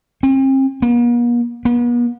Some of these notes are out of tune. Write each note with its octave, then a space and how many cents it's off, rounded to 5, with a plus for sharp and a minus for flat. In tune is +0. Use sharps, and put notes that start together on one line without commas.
C4 +40
A#3 +45
B3 -45